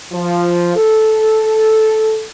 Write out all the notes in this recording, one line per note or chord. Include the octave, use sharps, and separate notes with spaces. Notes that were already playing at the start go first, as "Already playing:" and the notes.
F3
A4